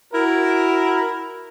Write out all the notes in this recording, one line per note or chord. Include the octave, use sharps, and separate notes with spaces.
E4 F#4 A#4